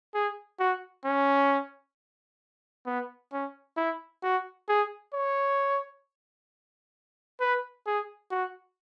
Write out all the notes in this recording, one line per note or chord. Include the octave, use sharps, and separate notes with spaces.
G#4
F#4
C#4
B3
C#4
E4
F#4
G#4
C#5
B4
G#4
F#4